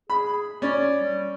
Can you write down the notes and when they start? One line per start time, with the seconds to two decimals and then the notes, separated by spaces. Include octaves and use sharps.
0.10 G#4 B5
0.62 C#4 D5
1.01 G3